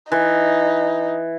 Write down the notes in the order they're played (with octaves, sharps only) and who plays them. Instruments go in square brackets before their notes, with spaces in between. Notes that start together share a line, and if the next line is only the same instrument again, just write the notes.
[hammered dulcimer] E3 [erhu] D#4